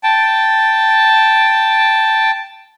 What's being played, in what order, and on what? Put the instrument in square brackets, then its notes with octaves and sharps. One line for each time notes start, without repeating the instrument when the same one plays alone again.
[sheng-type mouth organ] G5 A5